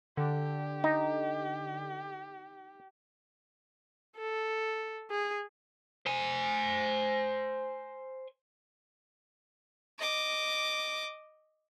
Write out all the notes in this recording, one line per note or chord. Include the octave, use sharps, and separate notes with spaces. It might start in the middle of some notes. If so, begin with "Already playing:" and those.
D3 G4
D#4
A4
G#4
C5 G#5
D#5 D6